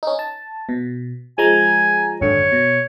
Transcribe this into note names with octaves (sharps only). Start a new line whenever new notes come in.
C#4 D#4
A5
B2
F3 G#3 G#5 A#5
G#1 F#2 D3 C#5
B2